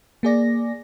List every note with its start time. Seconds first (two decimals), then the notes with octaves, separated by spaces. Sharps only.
0.23 A#3 G#4 D5 A#6